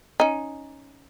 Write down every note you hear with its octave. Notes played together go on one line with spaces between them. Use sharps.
C#4 D#4